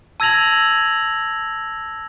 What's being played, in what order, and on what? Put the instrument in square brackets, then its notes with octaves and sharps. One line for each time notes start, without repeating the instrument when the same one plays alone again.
[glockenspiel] A5 E6 G#6 A#6 F7 F#7